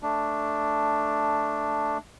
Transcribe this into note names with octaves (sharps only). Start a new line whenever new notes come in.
A3 D4